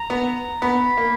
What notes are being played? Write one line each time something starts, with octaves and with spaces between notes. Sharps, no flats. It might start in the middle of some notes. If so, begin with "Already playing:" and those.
Already playing: A#5
B3
B3 B5
A#3